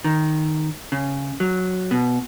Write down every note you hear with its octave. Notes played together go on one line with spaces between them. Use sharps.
D#3
C#3
F#3
B2